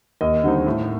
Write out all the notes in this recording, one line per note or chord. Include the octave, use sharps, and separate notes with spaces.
D#2 D#5
D3 G3 C4 D#4
A2